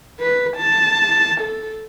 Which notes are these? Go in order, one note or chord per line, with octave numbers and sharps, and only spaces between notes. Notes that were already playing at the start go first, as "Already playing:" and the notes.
B4
A5
A4